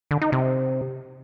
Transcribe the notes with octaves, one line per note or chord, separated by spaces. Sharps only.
D3
D#4
C3